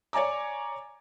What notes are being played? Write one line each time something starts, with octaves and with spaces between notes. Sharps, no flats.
C#5 D5 G#5 A#5 D6